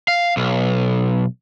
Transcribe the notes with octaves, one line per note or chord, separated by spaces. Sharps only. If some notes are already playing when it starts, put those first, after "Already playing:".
F5
B1